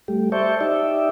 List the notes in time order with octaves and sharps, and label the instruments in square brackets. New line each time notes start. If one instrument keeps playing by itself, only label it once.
[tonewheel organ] G3 A3 G4
C5 D5 E5 A5 C#6 G6
D#4 G4 D5 E5